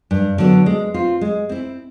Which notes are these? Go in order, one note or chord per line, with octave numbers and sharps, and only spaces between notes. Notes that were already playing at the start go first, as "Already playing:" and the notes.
G2
D3 F#3 B3 D4
G#3
C4 F4
G#3
C4 E4